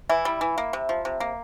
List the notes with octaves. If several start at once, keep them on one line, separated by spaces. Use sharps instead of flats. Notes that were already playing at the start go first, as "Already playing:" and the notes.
E3 E4
G3
E3
A#3
C3
F3
C3
A#3